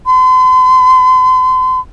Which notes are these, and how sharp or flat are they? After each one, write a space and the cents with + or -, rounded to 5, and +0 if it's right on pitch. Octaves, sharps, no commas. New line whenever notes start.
C6 -40